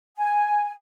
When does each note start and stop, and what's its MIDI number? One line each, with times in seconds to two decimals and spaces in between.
0.17 0.72 80